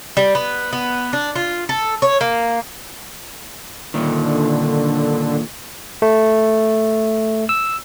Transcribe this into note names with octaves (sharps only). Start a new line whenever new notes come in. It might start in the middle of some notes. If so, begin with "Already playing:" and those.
G3
B3
B3
D4
F4
A4
C#5
A#3
A#2 D3 D#3
A3
E6